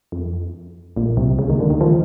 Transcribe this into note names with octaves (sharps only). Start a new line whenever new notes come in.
F2
A#1 A#2
C2 C3
C#2 C#3
D#2 D#3
D2 D3
D#2 D#3
F3